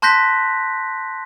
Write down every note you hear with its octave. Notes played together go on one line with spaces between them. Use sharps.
A5 C6 F#6 G6 A#6 B6